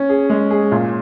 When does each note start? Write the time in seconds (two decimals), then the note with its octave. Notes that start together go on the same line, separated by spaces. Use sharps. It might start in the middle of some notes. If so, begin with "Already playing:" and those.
Already playing: C#4
0.09 G#4
0.30 G#3
0.51 G#4
0.72 A#2